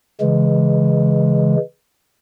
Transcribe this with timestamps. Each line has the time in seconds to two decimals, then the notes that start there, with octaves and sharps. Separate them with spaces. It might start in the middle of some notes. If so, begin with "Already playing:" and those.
0.21 C#3 E3 G#3